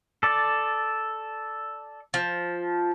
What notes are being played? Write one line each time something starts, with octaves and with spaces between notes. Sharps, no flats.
A4 D5
F3